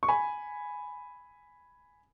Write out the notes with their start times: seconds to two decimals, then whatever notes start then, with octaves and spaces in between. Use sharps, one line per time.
0.03 C#6
0.08 G#5 B5